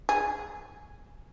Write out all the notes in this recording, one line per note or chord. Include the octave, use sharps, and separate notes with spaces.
G#4